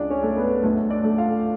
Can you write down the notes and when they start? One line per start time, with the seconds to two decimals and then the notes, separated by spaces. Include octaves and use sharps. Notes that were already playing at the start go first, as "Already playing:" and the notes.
Already playing: C#2 G#3 D4 D5
0.10 C#4 C#5
0.23 A3
0.36 B3 B4
0.63 D2 A3 A4
0.90 D4 D5
1.04 A3
1.18 F4 F5